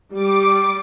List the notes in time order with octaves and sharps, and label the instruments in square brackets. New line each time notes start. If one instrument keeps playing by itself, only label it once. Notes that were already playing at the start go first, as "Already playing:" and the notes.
[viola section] G3 [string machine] D6